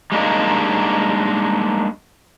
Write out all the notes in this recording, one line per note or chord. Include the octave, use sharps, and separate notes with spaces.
G3 G#3 A#3 D4 D#4